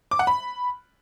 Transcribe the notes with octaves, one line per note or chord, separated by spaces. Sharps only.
D6
F#5
B5